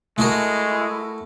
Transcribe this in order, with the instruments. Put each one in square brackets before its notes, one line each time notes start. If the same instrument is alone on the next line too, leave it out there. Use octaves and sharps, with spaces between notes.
[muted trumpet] G#3 [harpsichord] A3 F#4 A#4 [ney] E4